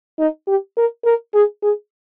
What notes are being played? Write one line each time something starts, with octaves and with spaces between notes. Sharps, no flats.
D#4
G4
A#4
A#4
G#4
G#4